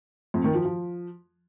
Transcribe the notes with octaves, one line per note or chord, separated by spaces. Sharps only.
F2
D#3
F3
F3